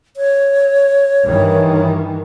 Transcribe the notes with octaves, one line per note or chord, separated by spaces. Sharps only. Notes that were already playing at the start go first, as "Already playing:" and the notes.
C#5
G2 D#3 E3